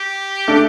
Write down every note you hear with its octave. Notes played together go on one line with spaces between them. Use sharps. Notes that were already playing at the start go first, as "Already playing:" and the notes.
Already playing: G4
A3 D4 A4